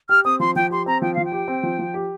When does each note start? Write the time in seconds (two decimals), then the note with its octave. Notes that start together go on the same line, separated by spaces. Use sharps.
0.09 G4 F6
0.24 C4 D#6
0.40 F3 C6
0.56 F3 G5
0.70 G4 C6
0.86 C4 A#5
1.02 F3 G5
1.14 F3 F5
1.25 G5
1.32 G4
1.48 C4
1.63 F3
1.79 F3
1.94 G4